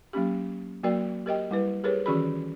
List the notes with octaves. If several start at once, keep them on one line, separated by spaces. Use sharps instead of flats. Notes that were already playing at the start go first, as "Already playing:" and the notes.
F#3 A#3 C#4 G4
F#3 A#3 F#4 A#4 D5 G5
G4 A#4 D#5 G5
G3 E4 B4
G4 G#4 A#4 B4 C#5
D#3 E3 C#4 F#4 G#4 B5